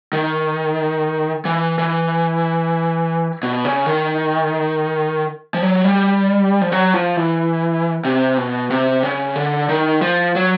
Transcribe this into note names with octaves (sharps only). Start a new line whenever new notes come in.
D#3
E3
E3
B2
C#3
D#3
F3
F#3
G3
F3
F#3
F3
E3
C3
B2
C3
C#3
D3
D#3
F3
F#3